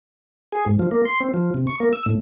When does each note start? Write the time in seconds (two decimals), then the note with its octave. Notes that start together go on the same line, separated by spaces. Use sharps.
0.52 G#4
0.66 G#2
0.79 F3
0.91 A#3
1.05 C6
1.20 C4
1.34 F3
1.54 C3
1.67 C#6
1.80 A#3
1.93 E6
2.06 A2